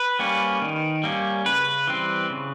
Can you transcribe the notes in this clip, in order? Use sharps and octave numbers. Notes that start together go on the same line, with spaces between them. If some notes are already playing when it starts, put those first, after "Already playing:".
Already playing: B4
G3 A#3 C#4
D#3
G3 A#3 C#4
C#3 B4
E3 G3 C4
C#3